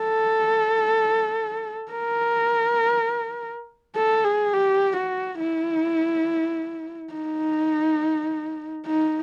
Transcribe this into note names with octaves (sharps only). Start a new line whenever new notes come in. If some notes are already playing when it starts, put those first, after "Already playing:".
Already playing: A4
A#4
A4
G#4
G4
F#4
E4
D#4
D#4